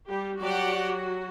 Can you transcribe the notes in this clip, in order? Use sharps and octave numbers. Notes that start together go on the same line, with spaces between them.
G3 G4
F#3 F#4 G4 D5 F#5